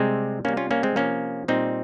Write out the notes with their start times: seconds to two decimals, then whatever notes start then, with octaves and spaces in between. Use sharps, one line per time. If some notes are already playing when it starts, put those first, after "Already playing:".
Already playing: C3 G3 G#3 C4
0.45 C3 A#3 C#4
0.49 G3
0.57 C#4 F4
0.71 A#3 C#4
0.83 G#3 C4
0.96 C3 F3 A#3 C#4
1.48 A#2 G3 C4 D#4